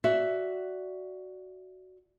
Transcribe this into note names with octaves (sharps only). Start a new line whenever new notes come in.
F#4 D5 E5